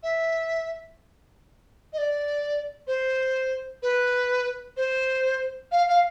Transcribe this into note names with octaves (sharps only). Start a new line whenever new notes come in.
E5
D#5
D5
C5
B4
C5
F5
F5